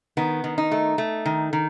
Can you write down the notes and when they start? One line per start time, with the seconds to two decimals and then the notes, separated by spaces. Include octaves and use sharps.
0.17 D#3 B3
0.44 D#3
0.58 D#4
0.72 A3
0.98 A3
1.26 D#3
1.53 D#3